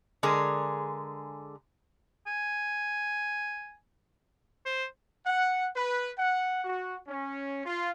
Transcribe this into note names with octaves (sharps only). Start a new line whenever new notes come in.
D3 G#3 G#4 A#4
G#5
C5
F#5
B4
F#5
F#4
C#4
F4